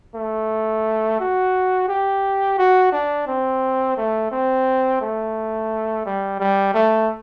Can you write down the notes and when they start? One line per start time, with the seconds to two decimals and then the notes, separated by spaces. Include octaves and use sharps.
0.14 A3
1.20 F#4
1.88 G4
2.58 F#4
2.92 D4
3.27 C4
3.97 A3
4.31 C4
5.01 A3
6.05 G3
6.40 G3
6.74 A3